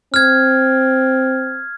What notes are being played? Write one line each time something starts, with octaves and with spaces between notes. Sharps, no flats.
C4 F6 G#6